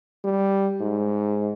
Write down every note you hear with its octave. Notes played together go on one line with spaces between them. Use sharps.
G3
G#2